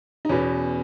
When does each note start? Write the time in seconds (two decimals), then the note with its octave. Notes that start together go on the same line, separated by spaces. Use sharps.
0.25 D#4
0.29 E2 B2 C#4